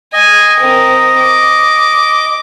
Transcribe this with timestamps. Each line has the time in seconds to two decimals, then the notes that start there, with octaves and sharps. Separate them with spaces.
0.13 D#5 G#5
0.59 C4 A#4
1.19 D6